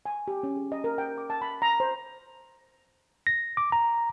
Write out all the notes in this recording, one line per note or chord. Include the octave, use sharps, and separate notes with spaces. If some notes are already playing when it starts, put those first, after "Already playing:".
G#5
G4
C#4
G#4
D#5
A#4
G5
D6
A5
B5
A#5
C5
A#6
D6
A#5